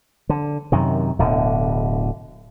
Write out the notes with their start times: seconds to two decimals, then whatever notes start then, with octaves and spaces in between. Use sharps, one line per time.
0.29 D3
0.72 F#2 C3 D#3
1.19 D1 B2 D3